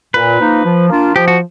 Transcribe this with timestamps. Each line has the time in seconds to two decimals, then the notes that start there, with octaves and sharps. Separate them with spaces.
0.14 A#2 B4
0.40 F3 A#3 D#4
0.65 F3
0.90 A#3 D4 F4
1.15 F3 G4
1.28 F#4